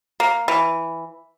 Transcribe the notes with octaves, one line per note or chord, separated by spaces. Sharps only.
A#3
E3